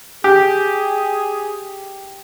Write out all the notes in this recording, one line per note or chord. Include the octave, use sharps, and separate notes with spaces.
G4 G#4